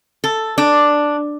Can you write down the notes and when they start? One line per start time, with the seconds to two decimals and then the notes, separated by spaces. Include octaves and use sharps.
0.24 A4
0.58 D4